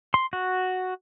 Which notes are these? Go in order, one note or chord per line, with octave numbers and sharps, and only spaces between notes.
C6
F#4